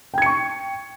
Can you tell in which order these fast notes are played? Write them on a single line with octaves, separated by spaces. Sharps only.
G5 G#6 C#7 C#6